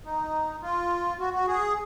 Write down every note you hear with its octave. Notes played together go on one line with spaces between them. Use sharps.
D#4
F4
F#4
F#4
G#4